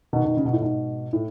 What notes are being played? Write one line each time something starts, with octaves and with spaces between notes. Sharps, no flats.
B2 D#3
B2 D#3
C#3
B2
A2
G#2 B2
A2